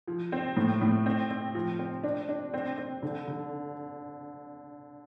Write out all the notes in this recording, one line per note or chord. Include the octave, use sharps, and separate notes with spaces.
F3
C4
A2
A2
C4
C4
F3
C4
D4
D4
C4
C4
D3
D3